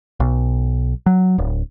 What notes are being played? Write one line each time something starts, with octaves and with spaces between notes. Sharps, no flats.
B1
F#3
D1